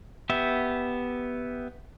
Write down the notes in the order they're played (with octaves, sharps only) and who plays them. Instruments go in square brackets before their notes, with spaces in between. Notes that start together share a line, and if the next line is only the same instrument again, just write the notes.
[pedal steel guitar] B3 G4 E5